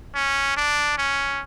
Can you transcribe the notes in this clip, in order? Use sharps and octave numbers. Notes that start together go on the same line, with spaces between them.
C#4
D4
C#4